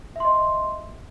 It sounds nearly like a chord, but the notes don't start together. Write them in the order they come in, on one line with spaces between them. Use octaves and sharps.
E5 C6 D#5